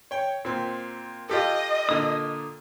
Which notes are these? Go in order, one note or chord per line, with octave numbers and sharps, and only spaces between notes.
C#5 G5
A#2 C4
F4 G4 A4 D#5
A#2 D3 D#6